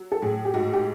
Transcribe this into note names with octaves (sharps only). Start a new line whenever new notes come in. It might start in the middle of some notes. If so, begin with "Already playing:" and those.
Already playing: F#3
A4
A2 G#4
G4
G#2 F#4
G4